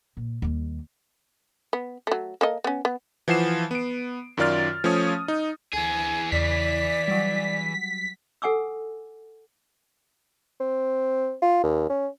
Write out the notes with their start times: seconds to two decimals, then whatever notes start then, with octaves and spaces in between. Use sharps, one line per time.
0.17 A#2
0.42 D#2 G3
1.73 B3
2.07 F#3 A3
2.41 A#3 A4 D#5
2.64 B3 C#4
2.85 B3
3.28 E3 F3 F#5 C7 E7
3.71 B3 D7
4.37 F#2 D#3 F4 D5 F6 A6
4.84 F3 A3 C#4 C#5 D#6
5.28 D#4
5.73 D2 E3 G#4 G#5
6.32 E2 C#3 D5 B6
7.08 F#3 G3
8.42 A4 F#5 G#5 D6 E6
10.60 C4
11.42 F4
11.64 D#2
11.90 C#4